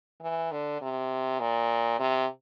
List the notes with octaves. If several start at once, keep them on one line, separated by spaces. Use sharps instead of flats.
E3
D3
C3
A#2
C3